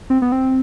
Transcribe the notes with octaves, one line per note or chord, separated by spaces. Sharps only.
C4
B3
C4